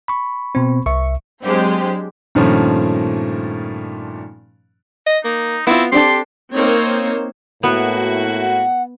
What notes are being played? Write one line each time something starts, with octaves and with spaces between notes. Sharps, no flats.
B5 C#6
B2 C4
C2 E5 C#6
F#3 G#3 C4 D4 G4 C5
G2 A#2 D#3 F3 A3 C#4
D#5
A#3 D#4
B3 C4 E4 F4
C4 D4 G4 A4 C6
A#3 C4 D#4 C5 C#5
A2 A#3 B3 E4 F#4
F#5